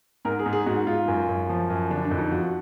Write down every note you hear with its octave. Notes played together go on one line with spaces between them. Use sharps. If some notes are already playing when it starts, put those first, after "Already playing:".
G#2 A#4
G#4
G#2
G#4
G#2 F#4
G#2 F4
F#2
F#2
F3
F#2
D3 D4
D4
F2
D#4
F3 F#4